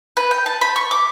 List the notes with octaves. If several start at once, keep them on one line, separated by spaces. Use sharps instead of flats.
B4
G5
A5
B5
C#6
D6